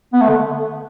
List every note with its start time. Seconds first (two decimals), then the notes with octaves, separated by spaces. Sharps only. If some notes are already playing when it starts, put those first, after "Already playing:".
0.13 B3
0.21 A3
0.28 D3